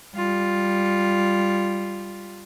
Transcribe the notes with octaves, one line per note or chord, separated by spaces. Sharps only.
G3 F4